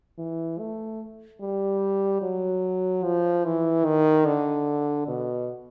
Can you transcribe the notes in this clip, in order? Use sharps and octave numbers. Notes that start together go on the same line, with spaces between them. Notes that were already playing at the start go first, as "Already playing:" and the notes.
E3
A3
G3
F#3
F3
E3
D#3
D3
B2